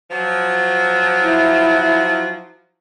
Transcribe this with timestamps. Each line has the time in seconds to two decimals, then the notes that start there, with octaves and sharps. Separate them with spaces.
0.11 F3 F#3
1.22 E4